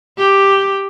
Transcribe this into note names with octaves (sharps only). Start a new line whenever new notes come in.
G4